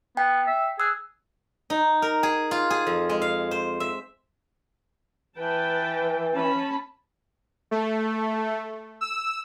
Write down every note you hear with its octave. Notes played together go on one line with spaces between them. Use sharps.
B3 G5
E5
G#4 E6 F#6
D#4
A#4
G#4
F4
G#4
F2
G#3
F5
C5
E5
E3 B4 G5 A5
C#4 A5 B5
A3
E6